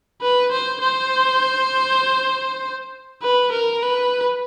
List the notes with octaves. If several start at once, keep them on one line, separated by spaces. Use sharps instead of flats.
B4
C5
C5
B4
A#4
B4